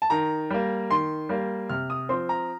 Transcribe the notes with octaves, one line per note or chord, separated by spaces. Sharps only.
A5
D#3 A#5
G3 A#3
D#3 C6
G3 A#3
C3 F6
D#6
F3 C4 C6
A#5